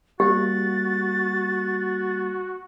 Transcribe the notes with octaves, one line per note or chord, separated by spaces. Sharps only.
G3 A#3 F#4 G4 A6